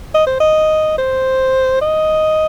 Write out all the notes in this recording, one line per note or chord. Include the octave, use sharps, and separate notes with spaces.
D#5
C5
D#5
C5
D#5